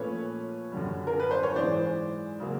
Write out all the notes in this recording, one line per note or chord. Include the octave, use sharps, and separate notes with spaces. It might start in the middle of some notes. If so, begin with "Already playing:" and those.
Already playing: A#2 F3 A3 C#4 F4 B4 C#5
F#2 D3 G3
A#4
B4
C5
C#5
G#2 E3 G#3 C5 D5
C#3 F#3 A#3